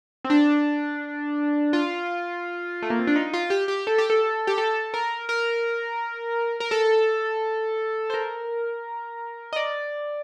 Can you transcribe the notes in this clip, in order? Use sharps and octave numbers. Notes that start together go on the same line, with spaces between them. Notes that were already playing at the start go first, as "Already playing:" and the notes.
C4
D4
F4
A3
A#3
C4
D4
D#4
F4
G4
G4
A4
G4
A4
G4
A4
A#4
A#4
A#4
A4
C5
A#4
D#5
D5